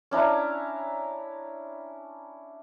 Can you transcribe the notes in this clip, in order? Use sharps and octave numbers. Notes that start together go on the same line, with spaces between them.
C#4 D4 E4 A#5